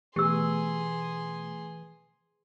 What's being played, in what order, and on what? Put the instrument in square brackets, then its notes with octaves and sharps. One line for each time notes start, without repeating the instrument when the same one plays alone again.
[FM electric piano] B2 A3 [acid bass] E3 [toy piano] G4 E6 [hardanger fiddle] G#4 C6